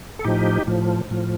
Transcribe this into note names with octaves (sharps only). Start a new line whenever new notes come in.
A4
A2 F3 D#4 G4
A2 F3
A2 F3